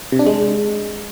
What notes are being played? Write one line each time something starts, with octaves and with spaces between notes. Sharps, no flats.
C3
D4
G#3